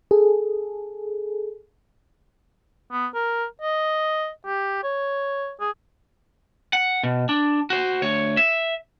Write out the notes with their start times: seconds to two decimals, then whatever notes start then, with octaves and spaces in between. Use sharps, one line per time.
0.11 G#4 A4
2.91 B3
3.15 A#4
3.62 D#5
4.46 G4
4.84 C#5
5.61 G#4
6.73 F#5
7.03 B2
7.29 D4
7.70 F#4 C5
8.02 D2 C#5
8.37 E5